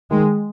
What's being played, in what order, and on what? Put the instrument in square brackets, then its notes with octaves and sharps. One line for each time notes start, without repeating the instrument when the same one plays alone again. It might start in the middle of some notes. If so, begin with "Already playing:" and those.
[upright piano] D#3 [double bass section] G#3